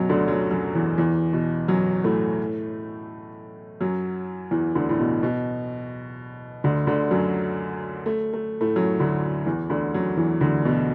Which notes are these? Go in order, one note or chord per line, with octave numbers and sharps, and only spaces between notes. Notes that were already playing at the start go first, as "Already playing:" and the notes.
Already playing: F#2 B2 F#3
D2 D3
F#2 F#3
F#2 F#3
E2 E3
E2 E3
B2
F#2 F#3
A2 A3
F#2 F#3
E2 E3
D2 D3
A2
B2
B2
D2 D3
D2 D3
F#2 F#3
A3
A3
A2 A3
F#2 F#3
D2 D3
E2 E3
D2 D3
F#2 F#3
E2 E3
D2 D3
B2